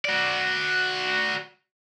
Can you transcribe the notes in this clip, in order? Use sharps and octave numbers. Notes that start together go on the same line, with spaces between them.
F#4 D5